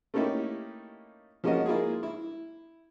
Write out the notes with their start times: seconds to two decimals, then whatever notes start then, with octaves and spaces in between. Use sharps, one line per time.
0.14 A3 A#3 C#4 D#4 E4 G4
1.44 F3 G#3 A#3 C#4 F#4 D#5
1.66 A#3 E4 F4 G#4
2.03 E4